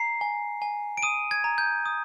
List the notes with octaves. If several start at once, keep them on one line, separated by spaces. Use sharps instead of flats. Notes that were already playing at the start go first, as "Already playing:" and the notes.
Already playing: A#5 C7
G#5
G#5
D7
D#6 D#7
G#6
A#5
G6
D#6